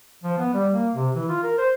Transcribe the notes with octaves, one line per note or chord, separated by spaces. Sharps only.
F3
B3
G3
A#3
C3
E3
F4
A#4
C5